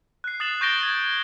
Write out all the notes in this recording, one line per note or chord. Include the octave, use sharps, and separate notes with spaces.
F#6 C7
D#6 F#6 A6 C7 E7 F#7
C#6 G6 A6 A#6 D7 G7
G#6